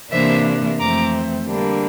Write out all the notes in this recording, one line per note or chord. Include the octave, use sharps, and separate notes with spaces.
C3 E3 A#3 D4 C5 E5
F2 E3 A3 C4 A#5 D6
D3 G3 A#3 D4